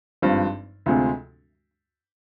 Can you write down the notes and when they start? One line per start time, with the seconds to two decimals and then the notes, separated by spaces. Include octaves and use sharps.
0.22 G#1 G2 F3 C4
0.86 D2 C3 F3 G#3